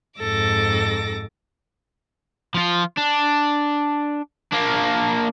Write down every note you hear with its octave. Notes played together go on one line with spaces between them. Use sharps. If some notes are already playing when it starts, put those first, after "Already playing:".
F2 G#2 A4 D6 A#6
F3 F4
D4
A#3 D4